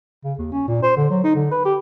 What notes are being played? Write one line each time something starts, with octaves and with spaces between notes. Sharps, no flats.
C#3
D#2
C#4
A#2
C5
D3
F#3
D#4
D3
B4
G4